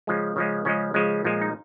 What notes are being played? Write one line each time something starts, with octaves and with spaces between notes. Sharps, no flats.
C#3 F3 G#3
C#3 F3 G#3
C#3 F3 G#3 C#4
C#3 F3 G#3
A#2 F3 G#3
D#4